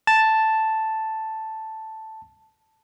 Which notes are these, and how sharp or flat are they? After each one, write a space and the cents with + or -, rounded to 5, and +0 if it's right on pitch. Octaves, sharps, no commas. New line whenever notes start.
A5 +0